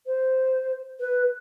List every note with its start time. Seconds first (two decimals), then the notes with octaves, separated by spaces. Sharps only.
0.07 C5
1.00 B4